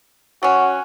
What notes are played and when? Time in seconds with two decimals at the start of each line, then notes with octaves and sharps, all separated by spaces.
0.43 F#3 C#4 F#4